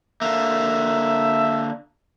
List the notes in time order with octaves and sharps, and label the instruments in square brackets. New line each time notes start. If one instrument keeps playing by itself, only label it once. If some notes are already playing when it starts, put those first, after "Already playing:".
[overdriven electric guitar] D3 A#3 [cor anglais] E5